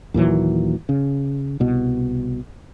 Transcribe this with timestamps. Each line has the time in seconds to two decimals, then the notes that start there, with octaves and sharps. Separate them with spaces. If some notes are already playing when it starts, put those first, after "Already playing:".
0.14 D#2 A#2 E3 F#3
0.89 C#3
1.60 C2 B2